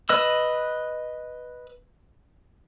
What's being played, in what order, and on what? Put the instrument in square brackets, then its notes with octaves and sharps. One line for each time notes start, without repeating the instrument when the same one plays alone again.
[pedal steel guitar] B4 D#5 E6